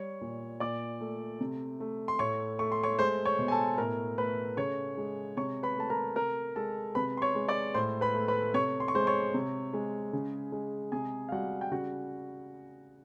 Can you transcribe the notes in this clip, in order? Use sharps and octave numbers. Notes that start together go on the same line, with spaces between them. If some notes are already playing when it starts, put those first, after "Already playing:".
Already playing: G3 C#5 C#6
A#2
A#2 D5 D6
A3
C3
A3
C6
A2 C#5 C#6
A3 C#6
C6
C#5 C#6
G#3 C5 C6
C#5 C#6
B2
G#5
A4 A5
A2 A#4 A#5
A3 B4 B5
C#3 C#5 C#6
G#3
C3 C#5 C#6
B4 B5
A3 A5
A#4 A#5
C3 A#4 A#5
G#3 A4 A5
C3 B4 B5
C6
C#5 C#6
G#3
D5 D6
A2 C5 C6
B4 B5
A3
B4 B5
C3 C#5 C#6
C6
C#6
G#3 C5 C6
C#5 C#6
C3
G#3
C#3
G#3
C3 G#4 G#5
F5
G3 F#4 F#5
G5
C#3 F#4 F#5